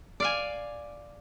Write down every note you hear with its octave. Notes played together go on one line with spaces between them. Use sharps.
D5 F5 G#5